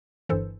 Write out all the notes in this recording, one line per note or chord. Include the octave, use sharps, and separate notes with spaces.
G1 G2 E3 A4 C5